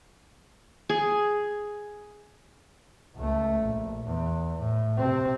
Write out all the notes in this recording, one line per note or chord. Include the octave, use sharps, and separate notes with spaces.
G#4
C#2 A3
A#1
E2
A2
C3 C4